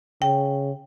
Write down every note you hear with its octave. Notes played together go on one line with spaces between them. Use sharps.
C#3 G5